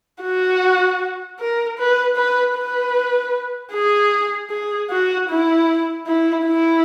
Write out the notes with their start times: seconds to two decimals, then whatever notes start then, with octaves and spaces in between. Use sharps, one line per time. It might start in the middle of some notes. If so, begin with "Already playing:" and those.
0.22 F#4
1.40 A#4
1.79 B4
2.16 B4
2.55 B4
3.73 G#4
4.50 G#4
4.90 F#4
5.29 E4
6.07 E4
6.46 E4